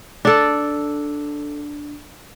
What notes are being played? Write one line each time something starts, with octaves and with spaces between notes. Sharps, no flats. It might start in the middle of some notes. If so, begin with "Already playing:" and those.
D4 A4